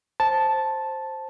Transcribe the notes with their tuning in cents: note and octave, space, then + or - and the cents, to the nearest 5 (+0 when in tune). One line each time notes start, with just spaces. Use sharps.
C5 +10 A5 -5